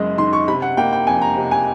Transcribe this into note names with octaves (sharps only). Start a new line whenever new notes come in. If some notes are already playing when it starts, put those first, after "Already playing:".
Already playing: F#1 F#2 G#3 D#5
D#3 C6
C#6
C3 B5
F#5
A#3 G5
G5
F2 G#5
A#5
C3
G#5